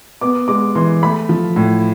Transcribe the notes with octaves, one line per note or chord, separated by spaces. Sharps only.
B3 D6
G#3 D6
E3 C6
A3 B5
F3
A2